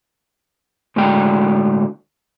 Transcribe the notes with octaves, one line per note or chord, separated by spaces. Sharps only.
A2 D3 G#3 D4 F#4 G5